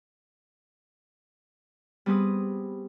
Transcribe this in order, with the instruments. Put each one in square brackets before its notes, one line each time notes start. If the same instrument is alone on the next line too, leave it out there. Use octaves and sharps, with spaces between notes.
[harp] G3 B3 C4 G#4 B4 D#6